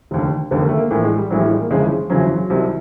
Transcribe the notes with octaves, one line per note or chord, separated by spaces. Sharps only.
F1 D#2 D3
F1 D#2 D3 B3
A#3
A3
A#3
A#1 A2 E3 A#3
G#3
G3
A#1 A2 E3 F#3
G3
G#3
A#3
G1 F2 C#3 E3 G#3
G1 F2 C#3 E3 F#3
F#3
C2 C3 D#3